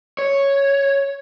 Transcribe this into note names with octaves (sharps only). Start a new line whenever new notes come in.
C#5